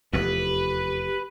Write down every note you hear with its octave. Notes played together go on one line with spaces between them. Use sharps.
F1 E2 G4 B4